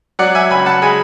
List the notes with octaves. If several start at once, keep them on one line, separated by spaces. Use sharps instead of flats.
F#3 D5 F#5
E5 G#5
C#2 G#5 B5
F#5 A5
G#3 G#5 B5